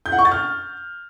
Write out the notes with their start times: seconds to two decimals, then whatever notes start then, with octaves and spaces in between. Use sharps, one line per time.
0.06 G6
0.12 F#5
0.19 C#6
0.25 A6
0.32 F6